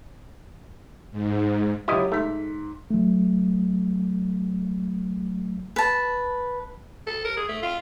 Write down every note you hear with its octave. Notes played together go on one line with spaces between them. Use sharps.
G#2
F#3 E4 F4 G4 D#5
G#2 A3 B6
F#3 A3
B4 A5
A4
A#4
G#4
A3
F4